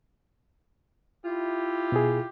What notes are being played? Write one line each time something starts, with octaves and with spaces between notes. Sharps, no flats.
E4 F4 G4
B2 G#4